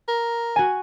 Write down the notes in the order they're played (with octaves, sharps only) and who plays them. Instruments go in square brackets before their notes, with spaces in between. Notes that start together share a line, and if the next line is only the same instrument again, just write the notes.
[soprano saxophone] A#4
[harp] F#4 G#5